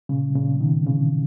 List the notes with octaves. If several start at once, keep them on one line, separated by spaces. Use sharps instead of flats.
A#2 C#3
A#2 C#3
B2 D#3
C#3 E3